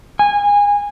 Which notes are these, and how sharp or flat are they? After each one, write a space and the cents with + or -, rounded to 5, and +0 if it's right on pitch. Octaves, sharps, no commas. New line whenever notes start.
G#5 -25